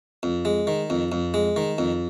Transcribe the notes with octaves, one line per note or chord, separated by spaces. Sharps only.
F2
G#3
D#3
F2
F2
G#3
D#3
F2